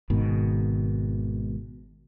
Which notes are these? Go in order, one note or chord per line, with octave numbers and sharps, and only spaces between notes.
G#1 G#2 B2 D#3